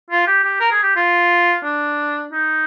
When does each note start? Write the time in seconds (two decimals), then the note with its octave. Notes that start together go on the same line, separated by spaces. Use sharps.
0.10 F4
0.27 G4
0.44 G4
0.60 A#4
0.71 G#4
0.83 G4
0.96 F4
1.64 D4
2.32 D#4